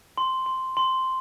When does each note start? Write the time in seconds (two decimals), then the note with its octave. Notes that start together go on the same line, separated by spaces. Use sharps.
0.18 C6
0.46 C6
0.77 C6